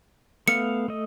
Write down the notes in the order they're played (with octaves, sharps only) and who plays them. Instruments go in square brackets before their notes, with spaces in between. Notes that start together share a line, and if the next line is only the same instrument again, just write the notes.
[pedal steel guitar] A3 B3 F5 [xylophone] C#7
[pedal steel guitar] A3 D#5